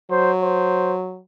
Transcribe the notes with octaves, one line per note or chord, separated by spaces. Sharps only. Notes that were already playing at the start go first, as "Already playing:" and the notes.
F#3 C5
C5